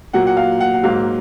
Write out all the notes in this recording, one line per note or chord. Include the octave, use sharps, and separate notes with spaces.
A#2 F#3 A#3 F#5
F#5
F5
F#5
F#5
G#2 F#3 A#3 F5